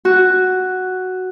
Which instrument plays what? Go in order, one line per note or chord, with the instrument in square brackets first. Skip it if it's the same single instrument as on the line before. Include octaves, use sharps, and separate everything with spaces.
[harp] F#4